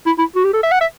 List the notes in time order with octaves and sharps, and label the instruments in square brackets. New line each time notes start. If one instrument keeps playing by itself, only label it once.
[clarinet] E4
E4
F#4
G4
A4
E5
F#5
E5